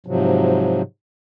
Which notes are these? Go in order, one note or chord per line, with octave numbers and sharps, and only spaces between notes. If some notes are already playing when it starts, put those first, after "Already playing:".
G#2 C3 F3 F#3